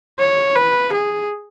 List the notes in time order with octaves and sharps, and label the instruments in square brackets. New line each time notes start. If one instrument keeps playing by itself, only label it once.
[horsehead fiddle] C#5
B4
G#4